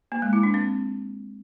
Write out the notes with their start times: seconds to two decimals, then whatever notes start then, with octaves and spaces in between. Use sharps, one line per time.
0.12 A#3
0.22 G#3
0.33 E4
0.43 D4
0.54 C4